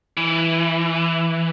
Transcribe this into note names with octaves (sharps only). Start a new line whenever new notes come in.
E3